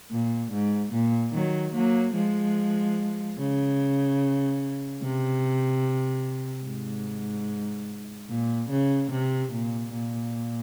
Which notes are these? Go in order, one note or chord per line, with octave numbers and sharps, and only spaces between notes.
A#2
G#2
A#2
D#3 F#3
F#3 A#3
F3 G#3
C#3
C3
G#2
A#2
C#3
C3
A#2
A#2